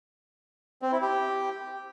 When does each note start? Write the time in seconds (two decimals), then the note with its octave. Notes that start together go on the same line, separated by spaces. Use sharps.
0.82 C4
0.92 E4
1.02 G4